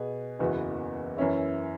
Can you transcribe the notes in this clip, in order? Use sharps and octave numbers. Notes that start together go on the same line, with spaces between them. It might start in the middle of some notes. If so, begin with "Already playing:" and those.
Already playing: B2 B3 G#4
F#1 E2 E3 B3 F#4
F#2 E3 C#4 E4